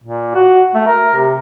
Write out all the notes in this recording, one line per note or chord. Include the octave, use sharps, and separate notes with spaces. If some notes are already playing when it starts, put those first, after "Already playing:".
A#2
F#4
A3
A#4
C3